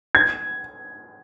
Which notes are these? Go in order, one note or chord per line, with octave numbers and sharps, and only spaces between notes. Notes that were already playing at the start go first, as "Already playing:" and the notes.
G#6